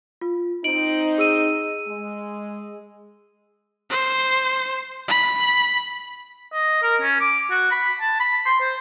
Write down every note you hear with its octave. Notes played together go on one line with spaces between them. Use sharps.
F4
C4 D#4 D7 F#7
G#4 E6 D#7
G#3
C5
B5
D#5
A#4
C#4
D6
F#4
B5
A5
B5
C6
C5